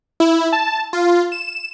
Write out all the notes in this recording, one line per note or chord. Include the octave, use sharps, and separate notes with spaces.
E4
A5
F4
E7